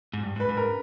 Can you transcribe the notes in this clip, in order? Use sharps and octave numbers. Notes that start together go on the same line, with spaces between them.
G#2
G2
G#2
B4
G#2
A#4